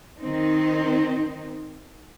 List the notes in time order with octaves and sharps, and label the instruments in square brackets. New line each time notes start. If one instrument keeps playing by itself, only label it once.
[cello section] D#3 C4 D#4